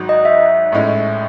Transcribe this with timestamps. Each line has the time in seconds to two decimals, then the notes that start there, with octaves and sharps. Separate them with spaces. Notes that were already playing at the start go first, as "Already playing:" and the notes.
Already playing: G#1 G#2 F#3
0.09 D#5
0.25 E5
0.72 A1 A2 G#3 C#4